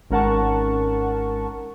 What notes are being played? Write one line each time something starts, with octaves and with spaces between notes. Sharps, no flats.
G#1 C#4 A#4 F#5 A5 C#6